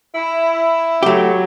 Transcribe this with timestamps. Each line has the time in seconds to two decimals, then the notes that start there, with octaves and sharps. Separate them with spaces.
0.15 E4
1.03 F#3 A3 G4